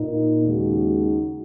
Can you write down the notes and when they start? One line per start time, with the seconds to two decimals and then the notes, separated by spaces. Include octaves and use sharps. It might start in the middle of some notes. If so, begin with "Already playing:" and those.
Already playing: A#2 A#3 D#4
0.42 D#2 C#3 G#3 D#4 F#4